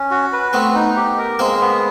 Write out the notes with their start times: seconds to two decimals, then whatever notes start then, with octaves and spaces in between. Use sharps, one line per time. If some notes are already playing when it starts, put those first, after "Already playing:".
Already playing: C#4
0.11 F#4
0.33 B4
0.53 A3 B3 C4
0.74 D#4
0.97 G4
1.18 A#4
1.39 G#3 A#3 C4
1.61 B3